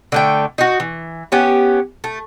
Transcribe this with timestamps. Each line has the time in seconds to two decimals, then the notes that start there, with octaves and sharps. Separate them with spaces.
0.12 D3 A3 G5
0.58 D#4 F#4
0.80 E3
1.32 B3 C#4 G4
2.04 A3